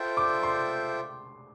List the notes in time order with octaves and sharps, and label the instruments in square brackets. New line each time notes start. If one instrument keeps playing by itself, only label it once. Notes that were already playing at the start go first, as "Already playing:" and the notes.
Already playing: [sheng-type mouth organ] F4 A4 C5 E5 G5
[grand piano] D6
C6